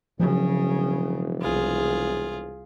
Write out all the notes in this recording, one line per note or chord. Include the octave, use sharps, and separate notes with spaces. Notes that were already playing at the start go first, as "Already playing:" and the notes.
E1 C#3 F3 F#3
C2 F4 G#4